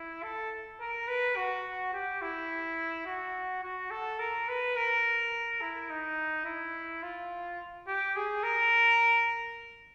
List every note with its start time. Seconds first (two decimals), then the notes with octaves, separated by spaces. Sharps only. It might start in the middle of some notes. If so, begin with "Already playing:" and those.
Already playing: E4
0.23 A4
0.81 A#4
1.08 B4
1.36 F#4
1.93 G4
2.22 E4
3.06 F#4
3.63 F#4
3.91 A4
4.19 A#4
4.49 B4
4.76 A#4
5.61 E4
5.90 D#4
6.45 E4
7.03 F4
7.87 G4
8.16 G#4
8.43 A#4